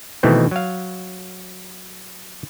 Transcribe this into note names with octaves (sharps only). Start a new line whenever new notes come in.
B2 D#3 E3 A3 C4
F#3 F5